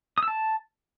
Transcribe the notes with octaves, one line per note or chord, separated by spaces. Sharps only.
D#6
E6
A5